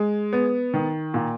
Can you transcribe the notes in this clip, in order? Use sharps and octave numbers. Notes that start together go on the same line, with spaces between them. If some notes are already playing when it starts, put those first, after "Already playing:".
Already playing: G#3
B3
D#3
A#2